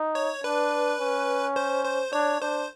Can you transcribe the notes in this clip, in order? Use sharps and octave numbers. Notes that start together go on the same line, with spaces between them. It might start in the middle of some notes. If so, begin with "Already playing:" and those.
Already playing: D#4
C#5
D4 B4
C#4
C5
C5
D4 C#5
D4 C5